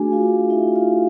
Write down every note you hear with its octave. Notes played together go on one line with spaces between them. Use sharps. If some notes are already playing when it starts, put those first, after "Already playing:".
Already playing: A3 D4 F#4 G#4 G#5
F4 F5
E4 E5
F4 F5